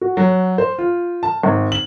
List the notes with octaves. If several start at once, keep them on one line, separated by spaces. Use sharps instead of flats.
F#4
F#3
C5
F4
A5
G#1
F#7